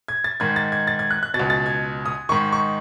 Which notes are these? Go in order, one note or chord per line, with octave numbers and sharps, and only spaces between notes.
G#6
A6
G#2 D#3 G#6
A6
G#6
A6
G#6
F#6
F#6
B2 A6
C#2
A6
G#6
D#6
G#2 D#3 C#6
C#6